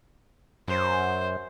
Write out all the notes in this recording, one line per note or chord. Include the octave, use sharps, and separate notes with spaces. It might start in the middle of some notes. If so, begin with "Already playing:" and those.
F#2 C5